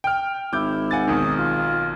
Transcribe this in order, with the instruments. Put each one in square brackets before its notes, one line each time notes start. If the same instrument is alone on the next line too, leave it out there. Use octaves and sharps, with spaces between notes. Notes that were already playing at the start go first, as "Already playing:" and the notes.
[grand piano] G5 F6
[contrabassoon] G#1 [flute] E4 [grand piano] D6 G6
[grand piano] F#5 G#5 A6
[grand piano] B1 D#3 [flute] D#6
[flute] F4